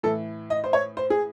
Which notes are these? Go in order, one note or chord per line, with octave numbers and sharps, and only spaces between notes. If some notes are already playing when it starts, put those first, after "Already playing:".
A2 E3 A4
D#5
C5
C#5
C5
G#4